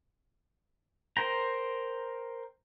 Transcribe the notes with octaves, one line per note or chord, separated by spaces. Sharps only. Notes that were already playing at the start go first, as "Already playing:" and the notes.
A#4 C5 G5 A#5